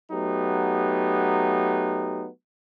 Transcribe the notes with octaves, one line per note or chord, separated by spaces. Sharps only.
F#3 A3 B3 D#4 G4